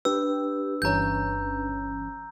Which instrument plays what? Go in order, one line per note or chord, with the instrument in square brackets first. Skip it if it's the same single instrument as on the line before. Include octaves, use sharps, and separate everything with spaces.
[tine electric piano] D4 B4 [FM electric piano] G4 [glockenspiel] E6
[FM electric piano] G1 E3 C#4 [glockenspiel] A#5 G6